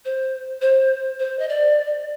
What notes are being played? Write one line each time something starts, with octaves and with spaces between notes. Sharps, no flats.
C5
C5
C5
D#5
D5